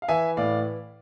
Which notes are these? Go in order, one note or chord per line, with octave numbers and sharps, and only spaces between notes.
F5
E3 E5 G#5
A2 D5 F5